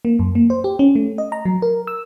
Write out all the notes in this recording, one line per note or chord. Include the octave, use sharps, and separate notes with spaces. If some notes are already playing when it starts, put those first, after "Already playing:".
A#3
F#2
A#3
C5
G4
C#4
A3
D#5
A#5
F#3
A#4
E6